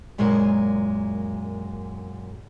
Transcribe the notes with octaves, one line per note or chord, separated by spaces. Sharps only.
F#2 A#2 G#3 A#3 G#4 A#4